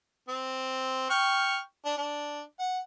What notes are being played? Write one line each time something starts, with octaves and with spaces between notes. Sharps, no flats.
C4
G5 C#6 F6
D4
D4
F#5